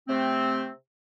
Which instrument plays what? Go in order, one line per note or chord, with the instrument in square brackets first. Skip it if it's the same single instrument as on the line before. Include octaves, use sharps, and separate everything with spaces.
[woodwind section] C3 A3 C4